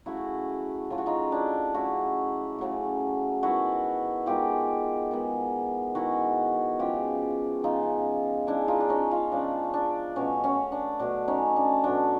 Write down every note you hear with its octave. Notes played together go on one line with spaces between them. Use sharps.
C#3 F#3 A3 E4 F#4
C#3 F#3 A3 F4
F#4
D#4 F4
D4 E4
C#3 F#3 A3 E4 F#4
C#3 F#3 A3
D#3 G#3 B3 E4 F#4
D#3 G#3 B3 F4 G4
D#3 G#3 B3
D#3 G#3 B3 E4 F#4
C#3 F3 G#3 F4 G4
C#3 F3 G#3 D#4 F4
C#3 F3 G#3 D4 E4
D#4 F4
D4
C#4 D#4
D#4 F4
C#3 F3 G#3 D4
D4
B2 F#3 A3 C#4
C#4
D4
B2 F#3 A3 D4
C#4 D#4
D4
B2 F#3 A3 D4